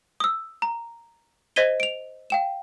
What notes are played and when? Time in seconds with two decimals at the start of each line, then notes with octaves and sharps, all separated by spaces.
0.20 D#6 E6
0.62 A#5
1.56 C5 D#5 G#6 B6 D#7 G7
1.80 D7 F7
2.30 F5 G5 E7